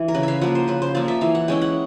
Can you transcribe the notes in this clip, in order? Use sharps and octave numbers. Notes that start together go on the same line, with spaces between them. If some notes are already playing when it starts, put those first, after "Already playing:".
Already playing: E3
A#4
C#3 B4
E5 F5
F3 A#3 F#5
C5
C#3 B4
C5
F3 A#3 D5
E5
E3 F5
F#5
G#3 C#4 E4 G5
F#5